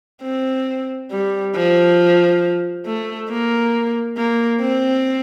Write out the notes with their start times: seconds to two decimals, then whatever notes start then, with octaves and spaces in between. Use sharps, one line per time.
0.23 C4
1.11 G3
1.55 F3
2.86 A3
3.30 A#3
4.17 A#3
4.61 C4